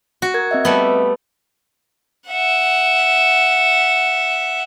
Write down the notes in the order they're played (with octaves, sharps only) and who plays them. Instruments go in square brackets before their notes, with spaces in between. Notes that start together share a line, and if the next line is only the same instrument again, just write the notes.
[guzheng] F#4
[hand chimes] A#4 G#6
C4 D#5 E5
[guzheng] G3 A3 B3
[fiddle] E5 F#5